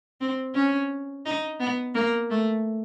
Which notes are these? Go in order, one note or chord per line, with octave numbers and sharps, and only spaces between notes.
C4
C#4
D#4
B3
A#3
A3